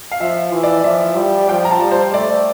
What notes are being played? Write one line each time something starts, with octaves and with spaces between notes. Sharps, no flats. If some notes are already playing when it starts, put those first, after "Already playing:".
F5
F3 E5
E3
D5
F3 E5
G3
F3 G5
A#5
A5
G3
C5
A3 D5